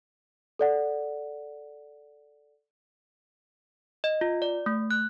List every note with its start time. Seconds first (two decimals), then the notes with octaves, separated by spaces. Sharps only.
0.59 A4 D5 F#5
4.04 D#5
4.21 F4
4.42 D5
4.66 A3
4.91 F#6